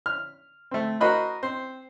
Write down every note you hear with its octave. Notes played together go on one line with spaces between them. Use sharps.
F6
A3 C4
F#4 A#4 C5 D#5 B5 F#6
C4 C5